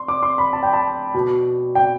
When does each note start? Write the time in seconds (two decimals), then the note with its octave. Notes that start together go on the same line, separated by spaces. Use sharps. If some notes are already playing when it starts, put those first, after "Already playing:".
Already playing: C6
0.08 D6
0.23 C6
0.38 B5
0.53 A5
0.63 G5
0.73 A5
1.14 B2
1.75 G5